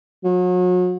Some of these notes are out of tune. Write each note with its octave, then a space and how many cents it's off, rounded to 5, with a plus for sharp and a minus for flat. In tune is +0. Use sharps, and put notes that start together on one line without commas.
F#3 -35